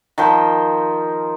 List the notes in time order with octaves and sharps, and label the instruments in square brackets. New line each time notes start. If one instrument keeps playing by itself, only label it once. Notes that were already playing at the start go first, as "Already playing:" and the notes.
[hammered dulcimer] D#3 F3 G5